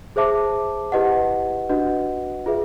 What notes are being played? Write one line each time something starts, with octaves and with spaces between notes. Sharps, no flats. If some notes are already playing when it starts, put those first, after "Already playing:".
G#4 C5 E5 A5 D6
E4 G4 B4 D#5 F#5
D4 F#4 B4 D#5 F#5
F4 G#4 B4 E5